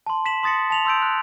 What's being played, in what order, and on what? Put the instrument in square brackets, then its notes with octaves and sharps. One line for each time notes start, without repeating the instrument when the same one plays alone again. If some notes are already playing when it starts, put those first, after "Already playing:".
[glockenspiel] A5 C6
B6 E7 F#7
C6 D#6 A6 A#6 C#7
A5 F7 F#7
C6 E6 G6 D7
F#6